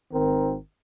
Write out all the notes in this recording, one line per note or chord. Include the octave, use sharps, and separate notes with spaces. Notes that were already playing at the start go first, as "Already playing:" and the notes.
G#1 D#3 C4 A#4